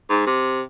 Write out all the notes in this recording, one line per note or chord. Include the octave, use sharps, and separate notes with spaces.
G#2
C3